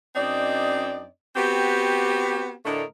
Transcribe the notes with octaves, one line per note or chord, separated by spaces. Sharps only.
F#2 C4 D4 D#4 D5 D#5
B3 C4 F#4 G4
A2 D3 A3 D4 A#4 D#5